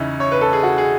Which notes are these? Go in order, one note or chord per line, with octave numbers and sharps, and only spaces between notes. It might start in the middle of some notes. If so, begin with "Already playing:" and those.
Already playing: E2 C#3 C#4 D#4 E4
C#5
B4
A4
G#4
F#4
G#4